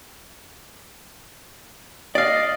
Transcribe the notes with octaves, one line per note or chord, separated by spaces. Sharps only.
D5 D#5 F5